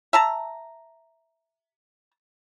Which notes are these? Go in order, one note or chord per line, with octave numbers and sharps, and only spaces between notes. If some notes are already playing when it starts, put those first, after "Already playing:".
E5 A5 A#5